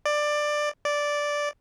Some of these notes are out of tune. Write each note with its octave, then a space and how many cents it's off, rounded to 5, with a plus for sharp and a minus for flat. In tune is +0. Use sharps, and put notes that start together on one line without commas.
D5 +15
D5 -5